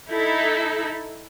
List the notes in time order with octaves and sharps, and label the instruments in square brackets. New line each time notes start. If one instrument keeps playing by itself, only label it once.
[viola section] D#4 E4 A4